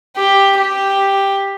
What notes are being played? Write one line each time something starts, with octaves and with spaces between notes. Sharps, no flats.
G4
G4